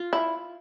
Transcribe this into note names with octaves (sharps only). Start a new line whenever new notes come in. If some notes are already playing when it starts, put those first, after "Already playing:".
Already playing: F4
E4